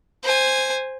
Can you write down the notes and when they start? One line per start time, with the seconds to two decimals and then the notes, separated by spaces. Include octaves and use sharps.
0.23 C5 G#5